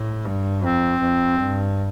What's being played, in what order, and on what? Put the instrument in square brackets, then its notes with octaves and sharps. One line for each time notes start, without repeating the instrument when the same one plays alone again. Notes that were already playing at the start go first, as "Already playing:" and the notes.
Already playing: [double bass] A2
G2
[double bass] F2 [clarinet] C4
[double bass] F2
G2